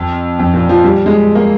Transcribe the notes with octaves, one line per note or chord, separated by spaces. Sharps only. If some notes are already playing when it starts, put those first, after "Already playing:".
Already playing: F2
F2
A#2
F3
G3
G#3
A#3